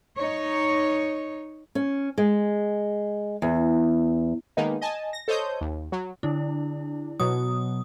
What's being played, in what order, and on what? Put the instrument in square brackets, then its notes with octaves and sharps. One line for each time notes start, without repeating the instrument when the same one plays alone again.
[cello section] D#4 C#5
[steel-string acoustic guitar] C#4
G#3
E2
[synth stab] D#3 G#3 A#3 B3 D#4
D#5 G#5 A5
A#6
A4 C5 C#5 D#5 D#6 G6
D#2
F#3
[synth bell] D3 E4 [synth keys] D4
[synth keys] B2 F#3 [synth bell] D#6